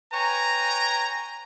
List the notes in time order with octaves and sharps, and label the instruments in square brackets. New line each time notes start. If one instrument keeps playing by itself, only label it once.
[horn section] B4 C#5 G5 G#5 A#5